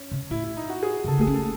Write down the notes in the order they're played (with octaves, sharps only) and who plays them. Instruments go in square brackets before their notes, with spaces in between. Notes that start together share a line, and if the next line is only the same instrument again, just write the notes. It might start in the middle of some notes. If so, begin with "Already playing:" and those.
Already playing: [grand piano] C#4
[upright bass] C3
[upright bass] A2 [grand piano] E4
[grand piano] E4
D#4
F#4
G#4
[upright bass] C3
[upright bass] C#3 [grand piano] A4
[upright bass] A3
[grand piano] G#4
[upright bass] C#4
[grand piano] A4